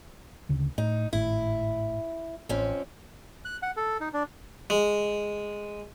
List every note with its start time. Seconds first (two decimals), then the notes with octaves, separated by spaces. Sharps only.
0.49 D2 C#3
0.78 A2 D#4
1.13 G#1 A2 E4
2.49 A1 F2 C4 C#4
3.45 F#6
3.62 F#5
3.77 A4
4.01 D#4
4.14 D4
4.70 G#3